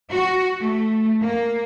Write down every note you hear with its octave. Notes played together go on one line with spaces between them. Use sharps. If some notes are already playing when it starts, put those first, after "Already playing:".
F#4
A3
A#3